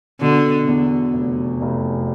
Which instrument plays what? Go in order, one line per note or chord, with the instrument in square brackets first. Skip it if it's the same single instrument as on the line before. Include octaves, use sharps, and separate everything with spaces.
[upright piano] B2 [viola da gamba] D3
[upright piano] E2
F1
F1